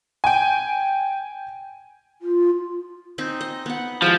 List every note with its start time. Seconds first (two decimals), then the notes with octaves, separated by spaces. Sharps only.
0.24 G5 G#5
2.22 F4
3.18 C4 D#4 G#5
3.41 D#5
3.66 B3 F#5
4.02 F3 G#3 E4 G4